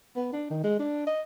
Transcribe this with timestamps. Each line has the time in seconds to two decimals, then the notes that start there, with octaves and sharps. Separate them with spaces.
0.16 B3
0.32 D4
0.50 D#3
0.64 G#3
0.79 D4
1.07 D#5